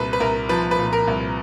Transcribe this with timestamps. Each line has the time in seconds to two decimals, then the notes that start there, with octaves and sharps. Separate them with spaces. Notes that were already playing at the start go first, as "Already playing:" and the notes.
Already playing: C2 A#2 B4
0.13 B4
0.20 C2 A#4
0.49 F3 B4
0.71 B4
0.79 A#2
0.93 A#4
1.07 C2